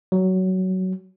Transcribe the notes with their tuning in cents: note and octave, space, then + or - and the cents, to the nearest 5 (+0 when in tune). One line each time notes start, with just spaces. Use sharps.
F#3 +15